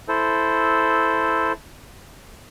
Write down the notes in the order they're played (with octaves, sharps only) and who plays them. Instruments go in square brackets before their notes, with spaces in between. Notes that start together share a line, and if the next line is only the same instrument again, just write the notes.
[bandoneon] E4 A4 C5